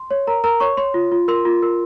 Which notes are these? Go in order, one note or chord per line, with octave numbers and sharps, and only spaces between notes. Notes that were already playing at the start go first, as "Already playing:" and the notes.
Already playing: C6
C#5
A#4 A#5
A#4 A#5
C#5 C#6
C#5 C6
F4
F4
A#4 C6
F4
A#4